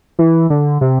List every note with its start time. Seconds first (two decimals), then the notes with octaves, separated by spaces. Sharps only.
0.19 E3
0.50 D3
0.81 C3